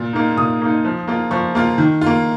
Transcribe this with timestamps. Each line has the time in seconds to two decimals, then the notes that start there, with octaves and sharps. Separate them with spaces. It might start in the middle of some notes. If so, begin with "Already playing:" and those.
Already playing: A#2
0.13 A#3 D#4
0.37 A#2 D#6
0.61 A#3 D#4
0.85 F3
1.08 A#3 F4
1.31 F3 C#6
1.55 A#3 F4
1.78 D#3
2.01 A#3 F4